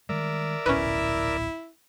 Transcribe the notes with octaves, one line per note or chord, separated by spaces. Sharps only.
D#3 G3 G#3 A#4 D5 E5
D1 A#1 B2 C#4 E4 B4